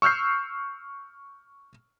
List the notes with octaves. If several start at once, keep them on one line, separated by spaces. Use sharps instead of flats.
C#6 E6 F6 G6 C7